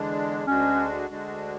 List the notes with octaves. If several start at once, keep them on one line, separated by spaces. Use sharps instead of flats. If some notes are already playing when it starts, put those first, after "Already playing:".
Already playing: E2 D3 G#3 D4
D2 D3 G#3 C#4 D4 F#4
D2 D3 G#3 D4 F#4